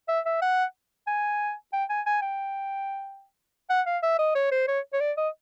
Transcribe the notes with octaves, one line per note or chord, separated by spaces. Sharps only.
E5
E5
F#5
G#5
G5
G#5
G#5
G5
F#5
F5
E5
D#5
C#5
C5
C#5
C#5
D5
D#5